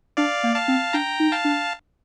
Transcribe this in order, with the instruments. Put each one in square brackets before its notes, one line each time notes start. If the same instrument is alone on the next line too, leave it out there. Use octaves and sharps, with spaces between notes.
[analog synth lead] D4 [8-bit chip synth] D5 F5
[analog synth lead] A#3
[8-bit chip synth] F5 A5
[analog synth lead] C4
[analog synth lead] D4 [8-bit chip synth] G5 A#5
[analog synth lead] D#4
[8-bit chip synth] F5 A5
[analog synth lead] D4